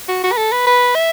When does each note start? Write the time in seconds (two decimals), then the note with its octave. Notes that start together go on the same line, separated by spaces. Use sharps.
0.08 F#4
0.24 F#4
0.32 B4
0.37 A4
0.52 B4
0.67 B4
0.95 E5